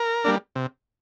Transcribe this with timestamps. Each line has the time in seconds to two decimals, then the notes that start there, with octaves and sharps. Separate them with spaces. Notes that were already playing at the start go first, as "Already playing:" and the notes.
Already playing: A#4
0.24 G3 A#3 D4
0.55 C3